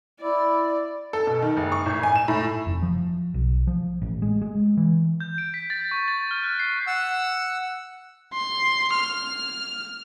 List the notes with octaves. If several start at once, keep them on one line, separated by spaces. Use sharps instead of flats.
E4 D5
A4
B2
D#3
F#1
C#6
A1
G#5
E7
A2
F1
F3
B1
F3
A1
G#3
G#3
E3
G6
D7
B6
A6
C#6
A6
F6
F#6
C7
F#5 E6
C6
F6